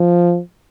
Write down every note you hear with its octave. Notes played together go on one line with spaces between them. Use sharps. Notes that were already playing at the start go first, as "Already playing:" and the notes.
Already playing: F3